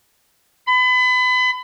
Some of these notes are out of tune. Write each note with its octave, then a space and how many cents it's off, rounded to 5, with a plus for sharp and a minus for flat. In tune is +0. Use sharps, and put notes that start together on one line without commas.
B5 +30